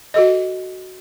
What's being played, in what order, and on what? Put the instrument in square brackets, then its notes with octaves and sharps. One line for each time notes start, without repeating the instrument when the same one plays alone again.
[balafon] F#4 A4 D#5